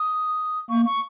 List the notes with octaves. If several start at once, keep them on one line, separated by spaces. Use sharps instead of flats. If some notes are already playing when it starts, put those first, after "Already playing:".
Already playing: D#6
A#3 C#6
C#6